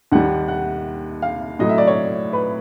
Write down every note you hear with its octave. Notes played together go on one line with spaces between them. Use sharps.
D#2 D#3 G3 F#5
F#5
F5
A2 F#3 D#5
E5
D5
C#5
B4